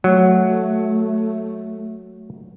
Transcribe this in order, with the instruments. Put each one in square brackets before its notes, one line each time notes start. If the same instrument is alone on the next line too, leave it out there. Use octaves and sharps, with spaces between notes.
[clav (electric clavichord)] F#3 [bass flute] A3